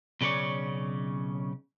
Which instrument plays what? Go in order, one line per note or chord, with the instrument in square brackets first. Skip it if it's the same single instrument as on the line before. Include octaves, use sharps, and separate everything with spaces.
[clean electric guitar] B1 C#3 C#4 B4 C#5 D5